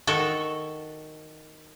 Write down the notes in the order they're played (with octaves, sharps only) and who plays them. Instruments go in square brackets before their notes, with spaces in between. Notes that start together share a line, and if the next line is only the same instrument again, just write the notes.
[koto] D#3 F#4 A4